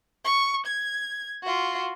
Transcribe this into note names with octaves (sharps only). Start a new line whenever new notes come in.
C#6
G#6
F4 F#4